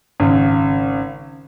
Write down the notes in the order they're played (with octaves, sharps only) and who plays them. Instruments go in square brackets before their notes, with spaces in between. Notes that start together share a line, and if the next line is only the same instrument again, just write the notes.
[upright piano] G#1 C#3